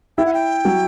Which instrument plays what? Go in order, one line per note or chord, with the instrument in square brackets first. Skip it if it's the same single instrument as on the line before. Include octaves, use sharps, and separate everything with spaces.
[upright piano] E4 [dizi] G5
[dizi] F#5
G5
[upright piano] F#3